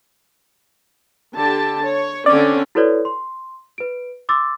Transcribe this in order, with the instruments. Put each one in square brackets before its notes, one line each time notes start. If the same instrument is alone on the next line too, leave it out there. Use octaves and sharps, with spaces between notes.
[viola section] D3 G4 A5
C#5
[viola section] D3 C4 C#4 [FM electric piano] D5
[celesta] E4 F#4 A4 B4 C#5 D5
C6
B4 D7
C6 D6 E6 A6